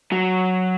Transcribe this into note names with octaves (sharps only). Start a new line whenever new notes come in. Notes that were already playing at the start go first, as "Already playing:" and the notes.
F#3